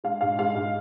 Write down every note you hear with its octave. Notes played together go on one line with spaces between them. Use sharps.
G#3 F5
G#2 F5
G#3 F5
G#2